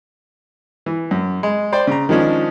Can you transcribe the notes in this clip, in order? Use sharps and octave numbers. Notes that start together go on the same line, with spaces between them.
E3
F#2
G#3
C5 D5 G5
C#3 A#5
D#3 F3 G#3 C#4 D4